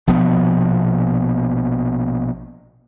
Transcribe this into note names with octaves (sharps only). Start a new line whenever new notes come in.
A#1 B2 F3 B3